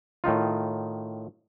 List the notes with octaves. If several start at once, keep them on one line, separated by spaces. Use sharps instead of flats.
A2 D#3 D#4 F4